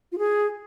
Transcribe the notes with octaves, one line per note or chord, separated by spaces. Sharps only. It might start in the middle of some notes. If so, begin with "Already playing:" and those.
F4
G#4